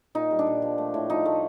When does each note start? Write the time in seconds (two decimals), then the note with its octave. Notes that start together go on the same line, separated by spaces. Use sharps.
0.15 A#2 D#4
0.31 G3
0.39 D4
0.47 A#2
0.62 F3
0.78 A3
0.94 A2
1.10 F3 D#4
1.25 A3